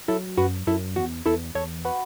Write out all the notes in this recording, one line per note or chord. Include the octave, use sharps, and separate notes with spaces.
F#3 E4 A4
F#2 F#4 B4
F#2 E4 A4
E2 F#4
E2 E4 A4
E2 A4 C#5
F#4 B4